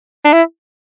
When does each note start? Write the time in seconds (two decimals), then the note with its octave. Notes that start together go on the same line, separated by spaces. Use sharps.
0.25 D4
0.33 E4